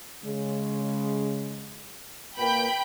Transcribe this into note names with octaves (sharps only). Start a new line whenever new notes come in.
C#3 G#3
A#2 A#3 B4 G5 B5